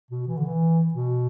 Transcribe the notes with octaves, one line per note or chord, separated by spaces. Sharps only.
B2
E3
D3
E3
B2